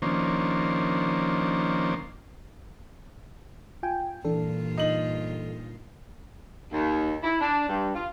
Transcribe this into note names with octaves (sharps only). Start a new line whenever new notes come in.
D#3 F3 A#3 C#4 D4 C5
F4 G5 G#5
G2 A#2 E3 D4 F4 A4
D#4 F#7
D#2
E4
D4
G2
F4